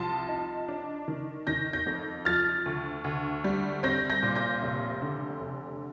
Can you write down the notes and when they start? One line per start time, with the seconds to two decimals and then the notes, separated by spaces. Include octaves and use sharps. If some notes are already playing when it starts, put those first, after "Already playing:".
Already playing: C2 F3 A5 C6
0.28 D#4
0.68 D4
1.08 D#3
1.47 D#3 G6 A#6
1.73 G6 A#6
1.86 F2
2.25 F3 F6 A6
2.66 D2
3.04 D2
3.44 G3
3.83 C4 G6 A#6
4.10 G6 A#6
4.23 A#2
4.35 G6 A#6
4.62 F1
5.02 D3
5.41 F1